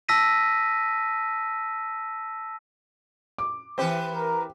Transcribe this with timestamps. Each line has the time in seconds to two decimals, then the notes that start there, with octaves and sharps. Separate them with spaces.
0.09 A5 E6 A#6 B6 D#7
3.38 D6
3.78 E3 C4 G4 B4 C5
4.14 A#4